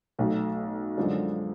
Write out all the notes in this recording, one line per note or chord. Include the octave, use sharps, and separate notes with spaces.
B1 B2 A3
F#2 D3 F3 G#3 D4